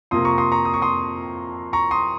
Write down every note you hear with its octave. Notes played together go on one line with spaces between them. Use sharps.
F2 C3 F3 A#3 C6 D#6
A#5 C#6
C6 D#6
A#5 C#6
D#6
C#6
C6 D#6
A#5 C#6
C6 D#6